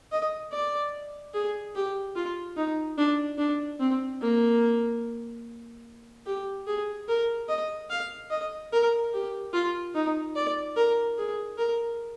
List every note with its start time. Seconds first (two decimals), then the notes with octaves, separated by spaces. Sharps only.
0.12 D#5
0.53 D5
1.34 G#4
1.76 G4
2.16 F4
2.57 D#4
2.98 D4
3.39 D4
3.80 C4
4.21 A#3
6.26 G4
6.67 G#4
7.08 A#4
7.49 D#5
7.90 F5
8.30 D#5
8.73 A#4
9.13 G4
9.53 F4
9.95 D#4
10.36 D5
10.76 A#4
11.18 G#4
11.58 A#4